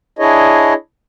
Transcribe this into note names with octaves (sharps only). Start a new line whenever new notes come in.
D4 E4 G#4 C#5 D#5